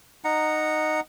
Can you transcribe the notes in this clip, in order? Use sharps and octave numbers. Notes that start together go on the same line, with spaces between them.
D#4 F#5 A#5